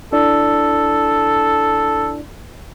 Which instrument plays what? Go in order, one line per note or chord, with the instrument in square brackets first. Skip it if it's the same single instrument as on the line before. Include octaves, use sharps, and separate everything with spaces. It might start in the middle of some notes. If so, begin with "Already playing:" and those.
[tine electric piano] D4 E4 D5 [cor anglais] A4